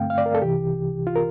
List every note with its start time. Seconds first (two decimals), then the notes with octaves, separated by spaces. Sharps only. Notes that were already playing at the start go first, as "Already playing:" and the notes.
Already playing: G2 D3 A3 C4 F5 G5
0.10 F5
0.18 D5
0.26 A#4
0.35 A4
0.42 C2 C3 E3 G4
1.07 F4
1.16 A#4